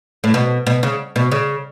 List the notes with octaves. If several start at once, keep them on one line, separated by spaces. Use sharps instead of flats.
A2
B2
B2
C#3
B2
C#3